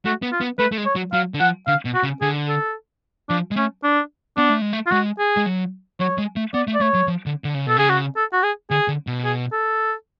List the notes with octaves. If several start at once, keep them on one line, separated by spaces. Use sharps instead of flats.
A3 F#4
B3
F4
B3
A3 B4
A3
G#3
C#5
F#3
F#3 F5
D3
F3 F#5
D3 F5
B2
F#4
C#3
D3 G#4
A4
F3 D4
G#3
A3 C#4
D4
B3 D4
A3
G#3
A3
F4
G#3 F#4
G#4
G#3
F#3
F#3 C#5
G#3
A3
B3 D5
A3
D5
A3 C#5
F#3
F3
D3
D3
C#3
B2 A4
C#3 G#4
F#4
A4
F#4
G#4
D3 G#4
D3
B2
G#4
A4